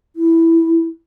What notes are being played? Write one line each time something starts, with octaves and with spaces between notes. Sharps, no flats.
E4